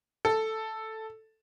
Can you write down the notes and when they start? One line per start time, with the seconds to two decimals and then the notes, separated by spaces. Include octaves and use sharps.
0.25 A4